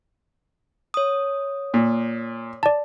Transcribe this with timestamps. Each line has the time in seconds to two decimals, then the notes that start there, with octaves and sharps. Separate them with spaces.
0.94 C#5 D#6
1.74 A#2
2.63 D5 A5